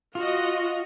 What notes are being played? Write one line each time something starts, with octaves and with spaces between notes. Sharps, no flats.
F4 F#4 D#5